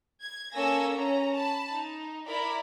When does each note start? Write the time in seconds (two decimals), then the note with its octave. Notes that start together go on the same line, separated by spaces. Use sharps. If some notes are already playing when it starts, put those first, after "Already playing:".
0.22 G#6
0.54 A#3 C#4 A4 G#5 E6 A#6
0.96 C#4 A#5
1.34 A5 B5
1.72 D#4
2.26 E4 A#4 D5 B5